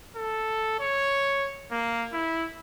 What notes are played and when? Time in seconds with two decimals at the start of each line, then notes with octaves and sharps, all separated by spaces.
0.16 A4
0.80 C#5
1.71 A#3
2.13 E4